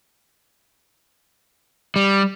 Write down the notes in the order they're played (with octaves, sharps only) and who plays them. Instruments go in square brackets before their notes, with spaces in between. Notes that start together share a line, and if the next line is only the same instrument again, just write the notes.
[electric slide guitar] G3